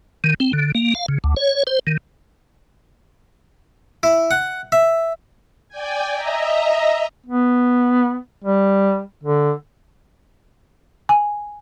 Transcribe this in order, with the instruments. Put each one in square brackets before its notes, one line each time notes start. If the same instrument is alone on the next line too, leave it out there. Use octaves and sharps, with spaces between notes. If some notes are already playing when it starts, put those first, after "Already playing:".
[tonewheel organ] D#3
C4
D3
A#3
F5
C#3
D2
C#5
C5
D#3
[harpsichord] E4
F#5
E5
[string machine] D5 G5 G#5
D#5 E5 A#5
[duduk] B3
G3
D3
[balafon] G#5